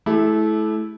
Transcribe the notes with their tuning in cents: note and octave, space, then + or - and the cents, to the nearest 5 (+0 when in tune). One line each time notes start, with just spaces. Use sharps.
A3 -30 E4 -10 G4 +25